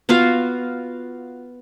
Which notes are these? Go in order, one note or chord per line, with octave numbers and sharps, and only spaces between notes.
B3 F4 F#4 F5